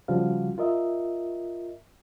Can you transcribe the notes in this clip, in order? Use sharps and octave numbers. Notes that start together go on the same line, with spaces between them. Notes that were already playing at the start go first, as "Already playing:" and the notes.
C#3 F3 G3 F#4 F5
F4 A#4 D#5 E5